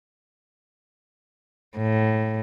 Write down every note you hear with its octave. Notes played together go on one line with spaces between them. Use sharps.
A2